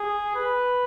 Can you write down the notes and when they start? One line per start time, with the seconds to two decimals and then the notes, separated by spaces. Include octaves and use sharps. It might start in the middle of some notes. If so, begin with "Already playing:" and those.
Already playing: G#4
0.35 B4